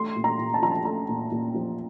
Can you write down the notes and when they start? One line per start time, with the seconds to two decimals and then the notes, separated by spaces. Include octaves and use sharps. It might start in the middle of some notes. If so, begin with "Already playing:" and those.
Already playing: A3 C6
0.16 A#2
0.24 A#5
0.38 A#2
0.54 A5
0.62 F3 A#5
0.72 A5
0.85 A3 A#5
1.09 A#2
1.31 A#2
1.54 F3